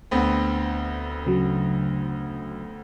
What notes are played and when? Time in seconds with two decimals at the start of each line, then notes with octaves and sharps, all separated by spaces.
0.11 D2 B3 C4
1.26 C#3 F#3